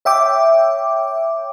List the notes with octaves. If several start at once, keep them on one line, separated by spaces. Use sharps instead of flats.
C#5 E5 G5 D6